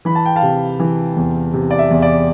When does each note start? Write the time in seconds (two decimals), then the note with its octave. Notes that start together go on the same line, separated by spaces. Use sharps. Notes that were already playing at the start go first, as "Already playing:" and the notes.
0.05 E3 B5
0.15 A5
0.26 G5
0.36 F5 A5
0.43 C3
0.80 E3
1.16 E2
1.53 C3
1.71 D5
1.79 E5
1.90 E2
2.02 D5